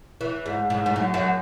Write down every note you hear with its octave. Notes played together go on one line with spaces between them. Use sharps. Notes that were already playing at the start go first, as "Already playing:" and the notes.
E3
G#2
G#2
G#2
F#2
F#2